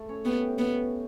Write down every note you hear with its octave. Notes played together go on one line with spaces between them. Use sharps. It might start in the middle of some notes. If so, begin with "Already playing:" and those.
Already playing: A3 A4
C#4 C#5
B3 G4 G5
B3